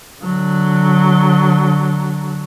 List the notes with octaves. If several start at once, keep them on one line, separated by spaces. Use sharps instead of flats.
D3 F#3